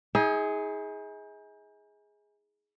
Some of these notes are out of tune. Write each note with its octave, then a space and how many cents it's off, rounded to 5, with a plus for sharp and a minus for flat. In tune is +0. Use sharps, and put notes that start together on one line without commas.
D#4 +45 G#4 +0 C5 +0